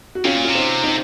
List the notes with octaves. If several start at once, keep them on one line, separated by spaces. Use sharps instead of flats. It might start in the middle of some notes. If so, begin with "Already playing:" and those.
F#4
C3 C#4 F4
A#2
C3 F4
C4 D#4
C4 D#4